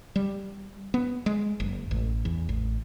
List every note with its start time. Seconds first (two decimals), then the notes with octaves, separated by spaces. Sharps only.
0.16 G3
0.94 B3
1.26 G#3
1.60 F#1
1.91 A1
2.25 E2
2.49 A1